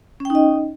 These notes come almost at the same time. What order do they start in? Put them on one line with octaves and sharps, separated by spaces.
C#4 G5 D#4 D#5